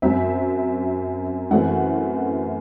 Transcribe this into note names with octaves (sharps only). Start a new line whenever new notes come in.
F#2 F#3 C4 E5
F#2 E3 A3 C4 E4 F#5